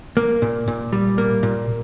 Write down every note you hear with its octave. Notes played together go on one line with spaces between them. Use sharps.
A#3
A#2
A#2
G3
A#3
A#2